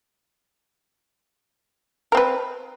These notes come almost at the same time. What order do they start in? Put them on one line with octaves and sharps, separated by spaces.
A#4 C4 B4